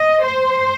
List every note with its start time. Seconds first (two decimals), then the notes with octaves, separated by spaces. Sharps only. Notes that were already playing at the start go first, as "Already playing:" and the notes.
Already playing: D#5
0.24 C5